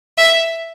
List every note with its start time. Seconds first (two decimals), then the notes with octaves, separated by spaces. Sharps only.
0.18 E5